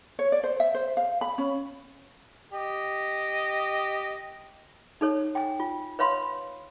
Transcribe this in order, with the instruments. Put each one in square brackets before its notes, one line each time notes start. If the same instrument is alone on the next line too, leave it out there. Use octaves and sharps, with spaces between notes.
[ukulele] C#5
D5
C5
E5
C5
F5
B5
C#4
[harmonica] G4 D#5
[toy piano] D#4 A4 C#5
G5 G#5
F4
B4 C#5 F5 B5 C6